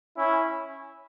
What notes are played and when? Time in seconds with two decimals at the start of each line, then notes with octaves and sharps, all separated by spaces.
0.17 C#4 E4